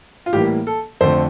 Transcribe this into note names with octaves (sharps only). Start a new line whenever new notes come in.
F4
A2 E3 G3 A#3 G4
A4
F2 D3 A3 C5